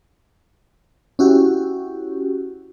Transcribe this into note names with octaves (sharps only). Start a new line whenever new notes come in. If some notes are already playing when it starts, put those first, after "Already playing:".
C#4 E4 F#4 G4